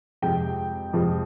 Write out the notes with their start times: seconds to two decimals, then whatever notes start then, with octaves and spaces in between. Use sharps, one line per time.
0.22 F2 C3 F3 G#3 G5
0.93 F2 C3 F3 G#3